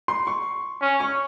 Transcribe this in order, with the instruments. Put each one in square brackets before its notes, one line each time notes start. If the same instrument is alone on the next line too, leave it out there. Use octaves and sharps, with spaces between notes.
[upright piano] C6
C#6
[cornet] C#4
[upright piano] C#6